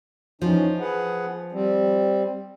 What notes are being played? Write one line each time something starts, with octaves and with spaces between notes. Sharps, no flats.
E3 F3 C#4 D#4
G#4 B4 F#5
G3 C4